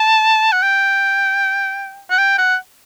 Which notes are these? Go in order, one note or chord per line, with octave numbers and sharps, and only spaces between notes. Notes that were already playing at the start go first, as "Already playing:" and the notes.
Already playing: A5
F#5
G5
F#5
G5
F#5